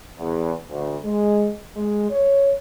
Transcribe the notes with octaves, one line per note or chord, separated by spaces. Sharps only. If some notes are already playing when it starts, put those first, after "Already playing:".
E2
D2
G#3
G#3
C#5